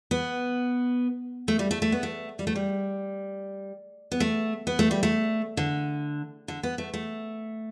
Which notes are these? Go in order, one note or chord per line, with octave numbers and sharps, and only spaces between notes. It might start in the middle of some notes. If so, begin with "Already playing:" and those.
B3
A3
G3
A3
A3
B3
A3
G3
A3
G3
B3
A3
B3
A3
G3
A3
D3
D3
B3
A3
A3